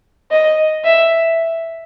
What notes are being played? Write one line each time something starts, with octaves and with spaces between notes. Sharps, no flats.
D#5
E5